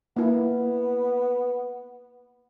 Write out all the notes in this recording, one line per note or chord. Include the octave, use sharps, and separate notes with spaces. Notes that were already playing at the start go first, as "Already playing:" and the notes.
A#3 B3 E4